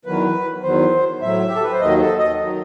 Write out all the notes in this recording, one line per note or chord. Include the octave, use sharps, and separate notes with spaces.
E2 D#3 F#3 B4
E2 D#3 F#3 C5
A2 F#3 E5
G4
A4
B4
C5
D#2 D#3 F#3 D#5
A4
D#5
D#3 F#3